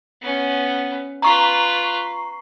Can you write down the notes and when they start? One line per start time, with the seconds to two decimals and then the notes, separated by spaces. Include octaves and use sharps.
0.21 B3 C#4
1.22 F4 B4 A#5 C#6 C7